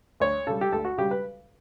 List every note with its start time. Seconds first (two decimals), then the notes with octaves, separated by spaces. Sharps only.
0.20 D2 C#5
0.47 C#3 G3 A4
0.61 G4
0.72 D2 A4
0.85 F#4
0.98 C#3 G3 G4
1.11 B4